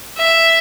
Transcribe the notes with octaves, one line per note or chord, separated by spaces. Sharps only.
E5